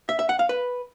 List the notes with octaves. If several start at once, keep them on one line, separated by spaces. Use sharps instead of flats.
E5
E5
F#5
F5
B4